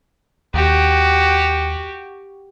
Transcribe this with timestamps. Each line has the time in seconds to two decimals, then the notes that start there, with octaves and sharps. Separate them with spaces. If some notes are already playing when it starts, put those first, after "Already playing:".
0.54 D#2 F#4 G4